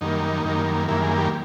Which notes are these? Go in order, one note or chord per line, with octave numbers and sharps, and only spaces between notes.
F#2 D#3 G3 A#3 D#4
F#2 D#3 G3 A#3
F#2 D#3 G3 A#3 E4
G#4
G4